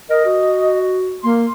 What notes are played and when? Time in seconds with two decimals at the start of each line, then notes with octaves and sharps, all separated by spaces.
0.10 A#4 D#5
0.25 F#4
1.24 A#3 C6